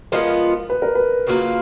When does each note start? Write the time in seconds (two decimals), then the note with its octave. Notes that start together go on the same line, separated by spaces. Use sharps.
0.12 F3 G#3 B3 F4 A#4
0.70 B4
0.82 A#4
0.95 B4
1.27 C#3 F#3 A#3 F4